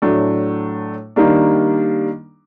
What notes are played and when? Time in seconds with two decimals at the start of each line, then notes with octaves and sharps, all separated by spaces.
0.02 A2 F#3 A3 D4
1.16 D#3 G3 A#3 D4